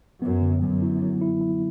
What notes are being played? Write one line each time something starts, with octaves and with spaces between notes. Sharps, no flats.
F#2 B3
D3
F#2 F#3
E4
F#3
E4
E4